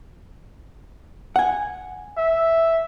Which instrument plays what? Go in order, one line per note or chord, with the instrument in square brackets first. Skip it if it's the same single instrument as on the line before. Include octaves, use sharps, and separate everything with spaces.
[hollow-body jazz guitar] F#5 G#5
[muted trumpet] E5